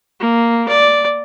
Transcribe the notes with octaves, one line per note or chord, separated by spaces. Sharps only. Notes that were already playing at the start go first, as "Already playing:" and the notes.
A#3
D5